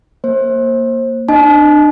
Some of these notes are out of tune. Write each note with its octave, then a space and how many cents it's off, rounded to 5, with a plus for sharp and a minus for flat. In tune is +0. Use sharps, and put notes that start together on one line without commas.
A#3 +0 C5 +30
D4 +30 D#5 +0 A5 -40